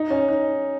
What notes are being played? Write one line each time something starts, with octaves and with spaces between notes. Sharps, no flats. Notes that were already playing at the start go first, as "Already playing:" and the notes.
Already playing: D#4
C#4
D#4